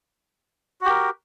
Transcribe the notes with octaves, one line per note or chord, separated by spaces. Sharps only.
F#4 G4 A#4